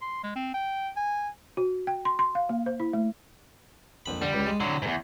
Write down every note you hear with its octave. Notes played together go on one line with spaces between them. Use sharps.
C6
G#3
C4
G5
G#5
F#4
G5
C6
C6
F5
A#3
C5
E4
A3
A#1 F2 B5
D3 G3
C#2
G#3
D3 F#3 E4
E2 G#2